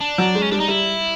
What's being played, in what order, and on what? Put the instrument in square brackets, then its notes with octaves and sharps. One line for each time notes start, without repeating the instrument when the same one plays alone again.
[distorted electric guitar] D4
[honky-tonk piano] F#3
G#3
[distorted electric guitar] C#4
[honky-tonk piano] G3 [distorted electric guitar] D4
[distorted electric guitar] D#4
[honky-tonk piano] G3 [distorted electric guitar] E4